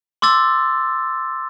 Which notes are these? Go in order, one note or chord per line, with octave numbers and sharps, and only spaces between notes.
C6 D6 E6 A6